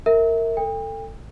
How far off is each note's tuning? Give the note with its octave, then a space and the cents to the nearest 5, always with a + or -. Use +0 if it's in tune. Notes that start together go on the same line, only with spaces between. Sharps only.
A#4 -20 E5 -25
A4 +20 G5 +40